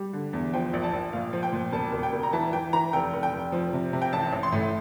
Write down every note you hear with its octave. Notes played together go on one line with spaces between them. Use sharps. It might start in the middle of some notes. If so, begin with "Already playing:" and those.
Already playing: G3
D3
E2
F3 G5
A#1
A5
A#1
A#2 F5
F3
G5
A#2
E1 A5
E1
G5
E1
A#5
E3 A5
E3 G5
E3 A#5
F1 G5
F1
G5
F1
F3
C3
C3
G5
A1 A5
A1
C6
A2